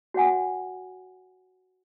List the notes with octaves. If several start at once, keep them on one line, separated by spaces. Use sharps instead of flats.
F#4 C#5 F#5 G#5